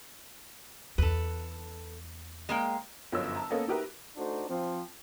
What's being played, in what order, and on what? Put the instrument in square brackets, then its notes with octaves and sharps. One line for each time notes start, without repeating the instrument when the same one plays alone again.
[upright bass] E2 [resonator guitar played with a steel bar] A4 B4
[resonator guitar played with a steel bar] G#3 A#3 G5
[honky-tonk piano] G1 F#2 F3 C#5 D#5 E6
A5 A#5
A#3 B3 C#4 A4 D#5
D#4 F#4 G4 A#4 B4 E5
[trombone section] A3 D4 D#4 F#4 C5
F3 C4